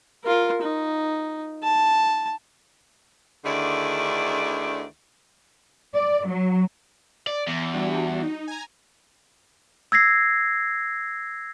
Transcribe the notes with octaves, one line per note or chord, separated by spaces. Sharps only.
F4 A#4
D#4
A5
D2 D3 D#3 E4 G#4 D5
D5
F#3
D5
E2
G3 D4 F#4
D#4
G#5 A#5
E6 G#6 A#6 C7